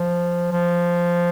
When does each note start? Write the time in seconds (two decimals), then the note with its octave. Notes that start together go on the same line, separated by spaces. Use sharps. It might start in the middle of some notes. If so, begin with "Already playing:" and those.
Already playing: F3
0.52 F3